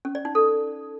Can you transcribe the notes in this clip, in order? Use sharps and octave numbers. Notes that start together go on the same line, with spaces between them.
C#4
D5
D#4
A4